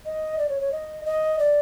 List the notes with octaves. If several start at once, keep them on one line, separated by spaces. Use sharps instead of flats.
D#5
D5
C#5
C#5
D#5
D#5
D5